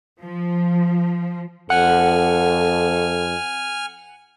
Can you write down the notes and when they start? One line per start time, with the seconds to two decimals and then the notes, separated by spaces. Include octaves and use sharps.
0.22 F3
1.70 F2 A4 F#5 G#5 F6